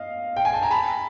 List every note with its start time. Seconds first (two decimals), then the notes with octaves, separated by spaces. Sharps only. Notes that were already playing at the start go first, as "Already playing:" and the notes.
Already playing: D#5 F5
0.37 G5
0.45 G#5
0.54 A5
0.63 A#5
0.71 A5 B5